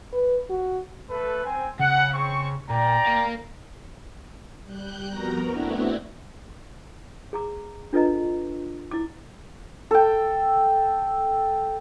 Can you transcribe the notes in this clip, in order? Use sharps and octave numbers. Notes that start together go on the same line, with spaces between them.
B4
F#4
A3 A4 B4
C4 G#5
C#3 F#5
C4 C#6
A#2 D5 G5 A#5
A#4 F5
G3 F#6 G6
F2 B3 F#4 A#4 A#5 A#6
A3 B3 C4 D4 E4 F#4
G#4 A#5 D6
D4 F4 A4 B4 D#5 A#5
E4 D6
A4 G5